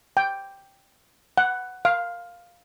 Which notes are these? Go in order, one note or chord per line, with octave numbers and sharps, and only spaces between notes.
G5
F#5
F5